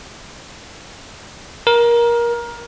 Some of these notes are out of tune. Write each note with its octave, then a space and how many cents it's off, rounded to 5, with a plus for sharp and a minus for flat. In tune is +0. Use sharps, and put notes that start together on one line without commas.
A#4 +20